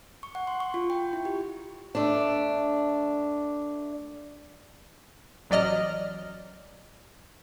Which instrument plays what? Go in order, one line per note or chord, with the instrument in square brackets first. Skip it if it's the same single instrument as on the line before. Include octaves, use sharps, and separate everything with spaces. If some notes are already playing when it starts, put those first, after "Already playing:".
[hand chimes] C#6
F#5
C6
C#6
F4
G5
E4
G4
[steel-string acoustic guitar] A3 D4
[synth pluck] A1 F#3 D5 D#5 F6